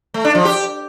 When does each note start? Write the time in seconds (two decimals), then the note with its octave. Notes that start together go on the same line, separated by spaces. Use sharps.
0.14 A3
0.25 D4
0.35 F3
0.45 G4